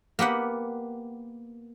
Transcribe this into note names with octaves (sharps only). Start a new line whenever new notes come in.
A#3 B3 G4 F#5